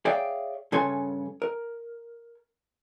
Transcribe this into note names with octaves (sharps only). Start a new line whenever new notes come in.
G#4 C#5 D5 E5 F5 G5
G2 C#3 A4 C#5 G#5 C6
A#4